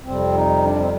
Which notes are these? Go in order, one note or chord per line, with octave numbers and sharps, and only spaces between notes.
F2 C3 G3 C4
D#4
D4
C4